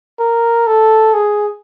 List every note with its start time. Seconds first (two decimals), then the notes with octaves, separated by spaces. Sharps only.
0.19 A#4
0.67 A4
1.14 G#4